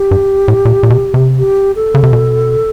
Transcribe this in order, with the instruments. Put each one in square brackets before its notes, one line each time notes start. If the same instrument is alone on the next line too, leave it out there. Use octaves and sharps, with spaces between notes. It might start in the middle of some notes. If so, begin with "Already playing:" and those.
Already playing: [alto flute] G4
[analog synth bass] G2
A2
A#2
A#2
B2
C3
[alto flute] G4
A4
[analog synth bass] C#3
C3
B2